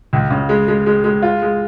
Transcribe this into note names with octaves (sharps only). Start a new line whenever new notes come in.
C#2
C#3
G#3
G#3
G#3
G#3
F4
G#3